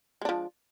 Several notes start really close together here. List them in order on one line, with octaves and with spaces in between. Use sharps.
G#3 D4 F3